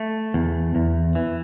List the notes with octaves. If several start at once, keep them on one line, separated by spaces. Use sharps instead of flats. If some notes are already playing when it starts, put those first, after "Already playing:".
Already playing: A3
E2
E2
E3